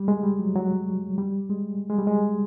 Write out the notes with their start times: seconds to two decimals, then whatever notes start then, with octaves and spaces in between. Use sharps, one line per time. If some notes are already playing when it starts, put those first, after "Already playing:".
Already playing: G3
0.08 G#3
0.23 G3
0.39 F#3
0.55 F#3
1.18 G3
1.50 G#3
1.90 G#3
1.99 G3
2.07 G#3